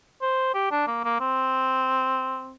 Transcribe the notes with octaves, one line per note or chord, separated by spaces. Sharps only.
C5
G4
D4
A#3
A#3
C4